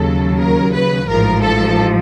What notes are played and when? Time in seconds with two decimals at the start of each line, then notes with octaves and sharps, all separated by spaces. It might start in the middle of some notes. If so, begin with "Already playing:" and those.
Already playing: D#2 C#3 F#3 A4
0.37 A#4
0.73 B4
1.08 A1 G#2 F3 A#4
1.43 A4